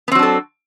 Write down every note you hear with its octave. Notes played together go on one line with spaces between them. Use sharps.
F#3 B3 C4 D4 A4